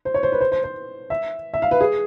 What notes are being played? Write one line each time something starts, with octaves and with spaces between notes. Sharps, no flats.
C5
C#5
C5
B4
C5
C5
C5
E5
E5
F5
B4
G#4